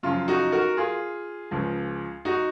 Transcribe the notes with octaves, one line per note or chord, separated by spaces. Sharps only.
F#2 C#3 F3 F4
D#4 F#4
F#4 A#4
F4 G#4
C#2 C#3 F3
D#4 F#4